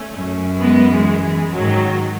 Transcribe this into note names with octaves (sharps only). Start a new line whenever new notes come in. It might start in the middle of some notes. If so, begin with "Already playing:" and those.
Already playing: A3 C#4
F#2
G#3 B3
E3 G#3
E3 G#3
G#2 D#3 F#3